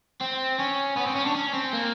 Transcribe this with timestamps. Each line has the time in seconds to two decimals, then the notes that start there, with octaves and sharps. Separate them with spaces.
0.21 C4
0.60 C#4
0.97 B3
1.07 C4
1.16 C#4
1.26 D4
1.35 C#4
1.54 C4
1.73 A#3